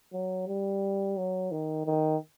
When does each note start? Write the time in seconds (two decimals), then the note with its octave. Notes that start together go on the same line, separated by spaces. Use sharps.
0.13 F#3
0.47 G3
1.17 F#3
1.52 D#3
1.86 D#3